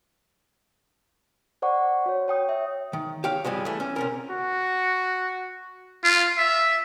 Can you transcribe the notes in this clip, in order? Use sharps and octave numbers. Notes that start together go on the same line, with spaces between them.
C5 D5 F#5 C#6
F#4 C#5
C#5 G5 D#6
E5
D#3
G4 C#5 F5
G2 F3 G3 G#3
E3 A3
C#4
C3 C#4 A#4
F#4
F4
E5